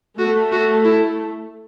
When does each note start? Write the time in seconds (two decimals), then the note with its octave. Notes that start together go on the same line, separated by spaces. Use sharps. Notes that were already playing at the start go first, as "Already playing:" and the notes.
0.19 A3 F#4
0.52 F#4
0.85 E4